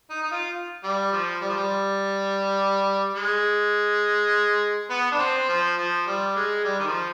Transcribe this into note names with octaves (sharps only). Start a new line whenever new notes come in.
D#4
D#4
F4
G3
F3
G3
F3
G3
G#3
B3
D4
C4
F3
F3
G3
G#3
G3
D#3
F3